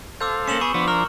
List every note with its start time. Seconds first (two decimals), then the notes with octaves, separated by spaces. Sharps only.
0.21 A4 C5 F5 D6 E6 G6
0.47 A#3 C#4 C#7 E7 F#7
0.61 B3 G#4 C#6
0.74 F3 B3 D4 C5
0.88 A#4 F6